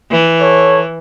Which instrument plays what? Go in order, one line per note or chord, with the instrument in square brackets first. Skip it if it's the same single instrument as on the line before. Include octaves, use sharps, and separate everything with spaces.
[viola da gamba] E3
[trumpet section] A4 C#5